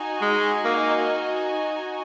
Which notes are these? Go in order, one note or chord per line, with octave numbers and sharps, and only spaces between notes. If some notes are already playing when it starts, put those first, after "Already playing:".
Already playing: D#4 F#4 D#5 G#5
G#3
A#3